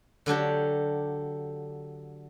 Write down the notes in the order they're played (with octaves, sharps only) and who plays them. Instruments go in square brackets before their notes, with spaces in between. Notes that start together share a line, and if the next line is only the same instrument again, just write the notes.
[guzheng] D3 F#3 D4 G4